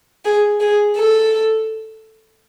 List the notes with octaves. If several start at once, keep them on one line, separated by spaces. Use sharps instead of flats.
G#4
G#4
A4